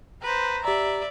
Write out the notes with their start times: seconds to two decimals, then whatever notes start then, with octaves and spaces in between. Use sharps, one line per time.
0.22 B4 C5 A#5
0.65 G4 D5 E5 A#5